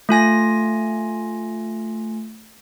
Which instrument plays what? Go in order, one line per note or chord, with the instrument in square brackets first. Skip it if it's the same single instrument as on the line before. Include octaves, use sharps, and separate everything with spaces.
[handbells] A3 F4 G#5 A#6